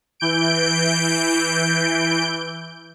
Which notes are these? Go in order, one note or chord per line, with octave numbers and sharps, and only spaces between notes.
E3 G6 D7